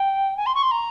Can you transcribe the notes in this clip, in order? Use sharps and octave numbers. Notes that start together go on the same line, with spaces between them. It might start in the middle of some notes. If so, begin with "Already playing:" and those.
Already playing: G5
G#5
C6
C#6
C6
A#5